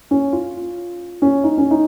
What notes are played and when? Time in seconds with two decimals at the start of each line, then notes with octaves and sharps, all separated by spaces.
0.11 C#4
0.33 F4
1.22 C#4
1.44 D#4
1.58 C#4
1.71 D#4